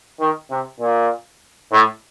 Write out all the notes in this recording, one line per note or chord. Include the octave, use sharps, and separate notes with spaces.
D#3
C3
A#2
A2